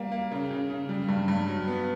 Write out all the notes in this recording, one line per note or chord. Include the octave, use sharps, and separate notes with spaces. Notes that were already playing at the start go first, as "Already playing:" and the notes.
Already playing: G3 A#3
A#3
C#3
C#3
C#3
G3
G2
G2
F#3
B3